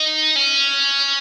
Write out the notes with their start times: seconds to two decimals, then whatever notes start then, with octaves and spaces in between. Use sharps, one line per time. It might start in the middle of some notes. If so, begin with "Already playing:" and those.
Already playing: D#4
0.36 C#4